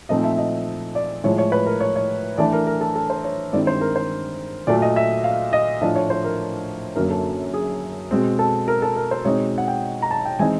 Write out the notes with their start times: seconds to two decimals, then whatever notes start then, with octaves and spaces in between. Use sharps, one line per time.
0.09 A#2 F3 A3 C4 D#4 D#5
0.24 E5
0.38 D#5
0.95 D5
1.24 A2 F3 G#3 C#5
1.38 C#5
1.52 B4
1.66 A#4
1.80 C#5
1.96 C#5
2.38 E3 A3 D4 D5
2.53 A#4
2.67 A#4
2.81 A4
2.95 A4
3.10 C5
3.24 C#5
3.52 G2 D#3 G#3 C4 E4 D5
3.67 C5
3.81 A#4
3.96 C5
4.67 A#2 F#3 A3 D5
4.82 D#5
4.96 E5
5.24 F5
5.53 D#5
5.82 A2 F3 A3 D4 F4 D#5
5.95 C#5
6.10 C5
6.24 A#4
6.96 F#2 D3 F#3 A#3 C#4 A#4
7.10 A4
7.54 G#4
8.11 B2 G#3 C4
8.39 A4
8.68 A#4
8.82 A4
8.96 A#4
9.11 C5
9.25 B2 G#3 C4 D#4 C#5
9.58 F#5
9.68 G5
10.02 A#5
10.11 A5
10.25 G5
10.39 E3 G#3 C4 D#4 G#5